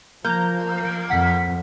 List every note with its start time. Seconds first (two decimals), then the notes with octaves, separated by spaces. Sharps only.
0.25 F3 A#3 A#5 G6
1.10 F2 F#5 B6